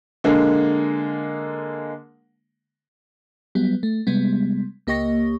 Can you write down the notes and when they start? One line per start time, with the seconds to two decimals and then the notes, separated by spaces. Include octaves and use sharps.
0.24 D3 G#3 A#3
3.55 F#3 G3 B3
3.83 A3
4.07 C3 G3 G#3 B3
4.87 C#2 A#3 G4 D#5 C#6 A#6